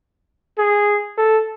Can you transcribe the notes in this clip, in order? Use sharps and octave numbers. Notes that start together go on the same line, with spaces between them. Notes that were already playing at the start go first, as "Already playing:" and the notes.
G#4
A4